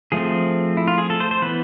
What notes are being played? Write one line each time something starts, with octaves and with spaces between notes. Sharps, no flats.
F3 A3 C4 G#4
E4
F4
G#4
A4
C5
C5
E3 B3 B4